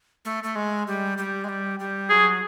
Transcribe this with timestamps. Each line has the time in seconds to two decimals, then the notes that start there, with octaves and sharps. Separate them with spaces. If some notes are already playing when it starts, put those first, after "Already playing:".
0.25 A3
0.43 A3
0.55 G#3
0.87 G3
1.18 G3
1.44 G#3
1.49 G3
1.79 G3
2.10 F#3 G#4